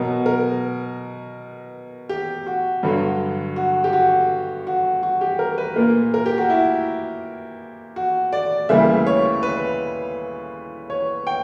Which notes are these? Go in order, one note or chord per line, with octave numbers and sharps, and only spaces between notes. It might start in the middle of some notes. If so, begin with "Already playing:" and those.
Already playing: B2 F#3 B3 A#4
A#4
G4
F#4
G2 D3 F#3
F#4
G4
F#4
F#4
F#4
G4
A#4
B4
A#2 A#3 A#4
A#4
G4
F#4
E4
F#4
D5
D2 C#3 E3 G3 A#3 E5
C#5
B4
C#5
G5